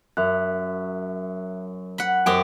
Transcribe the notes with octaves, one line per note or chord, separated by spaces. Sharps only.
F#2 E5 F#6
F#5 B5
F#2 C4 G4 G#4 F#5 G5 D7